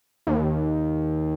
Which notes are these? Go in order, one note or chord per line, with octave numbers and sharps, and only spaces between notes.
D#2